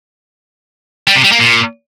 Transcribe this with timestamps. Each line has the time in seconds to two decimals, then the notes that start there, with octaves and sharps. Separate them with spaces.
1.07 G3
1.16 C3
1.24 G3
1.32 A#3
1.40 A#2